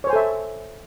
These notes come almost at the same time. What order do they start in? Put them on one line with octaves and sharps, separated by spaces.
C#5 C5 G#5 A4 E5